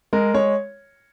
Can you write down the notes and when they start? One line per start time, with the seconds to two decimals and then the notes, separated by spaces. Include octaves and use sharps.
0.13 G#3 A#4
0.34 G#3 C#5